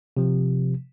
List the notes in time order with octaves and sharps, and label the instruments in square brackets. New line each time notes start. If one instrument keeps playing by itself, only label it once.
[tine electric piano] C3 F3